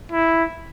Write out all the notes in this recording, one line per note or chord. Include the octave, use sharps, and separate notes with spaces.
E4